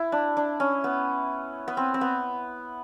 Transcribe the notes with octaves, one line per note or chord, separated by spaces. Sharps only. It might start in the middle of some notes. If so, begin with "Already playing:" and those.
Already playing: E4
D4
D4
C#4
B3
B3
C4
C4
B3